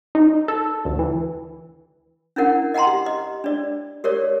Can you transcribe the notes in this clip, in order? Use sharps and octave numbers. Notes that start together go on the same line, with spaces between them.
D#4
A4
D2
E3
C#4 D4 E4 A#4 F#5
D#5 F#5 G5 A#5 C6
G4
D#5
D4 D5
G4 A#4 C#5 D5